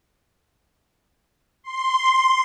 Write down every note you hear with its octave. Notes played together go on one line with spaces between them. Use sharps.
C6